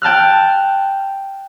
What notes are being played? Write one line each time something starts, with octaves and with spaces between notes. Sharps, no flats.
G5 A5 F6 F#6